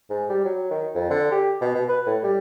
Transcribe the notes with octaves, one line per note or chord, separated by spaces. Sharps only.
G#2
G3
F#3
D#3
F2
D3
G4
B2
B2
B4
A2
G3